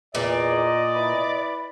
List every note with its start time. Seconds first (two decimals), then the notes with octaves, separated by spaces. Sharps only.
0.15 E2 A#2 D5 D#5
0.96 E4 B4 B5